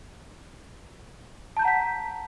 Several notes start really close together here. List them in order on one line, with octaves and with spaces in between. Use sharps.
A5 G6 A#5 F#5 B6